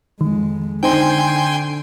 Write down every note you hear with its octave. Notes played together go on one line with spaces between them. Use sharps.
F2 D#3 G#3
D3 C4 D#4 G5 G#5 C6